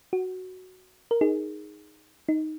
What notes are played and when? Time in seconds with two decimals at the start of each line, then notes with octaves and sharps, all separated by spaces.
0.13 F#4
1.11 A#4
1.21 D#4 G#4
2.29 D#4